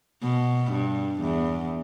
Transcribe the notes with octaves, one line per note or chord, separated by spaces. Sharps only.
B2
G2
E2